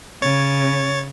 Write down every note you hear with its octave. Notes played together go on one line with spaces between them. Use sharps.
C#3 C#5 A6